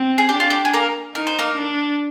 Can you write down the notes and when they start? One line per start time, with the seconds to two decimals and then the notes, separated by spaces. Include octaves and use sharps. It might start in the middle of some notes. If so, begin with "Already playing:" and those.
Already playing: C4
0.18 G#4
0.29 D4 G4
0.40 F4
0.50 G4
0.65 G#4
0.73 A#3 A#4
1.15 D#4 A#4
1.27 C5
1.39 A#3 A#4
1.57 D4